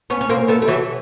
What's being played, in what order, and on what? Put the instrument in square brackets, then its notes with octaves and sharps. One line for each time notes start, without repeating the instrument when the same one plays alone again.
[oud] B3 C#4
C#4
A#3 C4
A3 B3
G3
E3 F#3